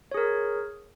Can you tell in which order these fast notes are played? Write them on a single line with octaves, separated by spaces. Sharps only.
C#5 G#4 A#4